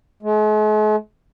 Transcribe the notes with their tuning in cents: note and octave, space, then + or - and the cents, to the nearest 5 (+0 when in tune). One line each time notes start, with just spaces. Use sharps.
G#3 +45